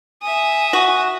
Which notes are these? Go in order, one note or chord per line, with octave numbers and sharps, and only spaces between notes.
E5 G#5 D#6
F#4